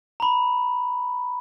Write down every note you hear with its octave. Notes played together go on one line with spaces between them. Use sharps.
A#5 B5